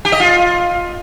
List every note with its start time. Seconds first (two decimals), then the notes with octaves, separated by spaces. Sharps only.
0.05 G4
0.12 D#5
0.20 F4